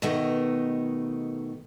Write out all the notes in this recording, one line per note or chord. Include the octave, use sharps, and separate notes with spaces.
B2 D#3 A3 A#4 D#5